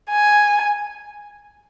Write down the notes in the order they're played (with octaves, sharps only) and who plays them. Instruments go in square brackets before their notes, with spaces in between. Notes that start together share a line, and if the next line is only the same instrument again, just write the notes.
[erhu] G#5